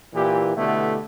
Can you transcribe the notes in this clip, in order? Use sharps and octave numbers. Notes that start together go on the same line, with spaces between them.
A#2 E3 G4
B2 D3 A3 B3 E4 G4